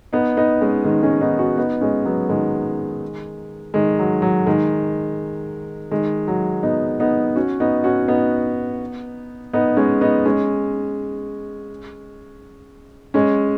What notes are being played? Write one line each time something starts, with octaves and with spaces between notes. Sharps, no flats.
B3 D#4
B3 D#4
G#3 C#4
D#3 G#3
G#3 C#4
B3 D#4
C#4 F#4
B3 D#4
G#3 C#4
F#3 B3
D#3 G#3
D#3 G#3
F#3
F#3
D#3 G#3
D#3 G#3
F#3
B3 D#4
B3 D#4
C#4 F#4
B3 D#4
C#4 F#4
B3 D#4
B3 D#4
G#3 C#4
B3 D#4
G#3 C#4
G#3 C#4